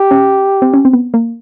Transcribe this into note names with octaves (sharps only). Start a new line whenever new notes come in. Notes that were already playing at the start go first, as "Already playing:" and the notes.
Already playing: G4
C#4
C4
C#4
C4
B3
A#3